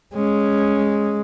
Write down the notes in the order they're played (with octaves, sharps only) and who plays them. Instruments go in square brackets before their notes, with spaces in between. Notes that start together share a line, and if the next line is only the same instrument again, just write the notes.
[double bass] G#3 [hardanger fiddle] C#4